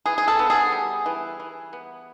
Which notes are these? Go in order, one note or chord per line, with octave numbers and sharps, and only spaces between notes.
E3 G#4
G#4
A4
B3
G#4
G3
E3
E3
B3